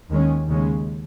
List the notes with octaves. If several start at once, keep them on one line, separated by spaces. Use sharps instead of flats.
D#2 D#3 G#3 C#4
D#2 C#3 G#3 C#4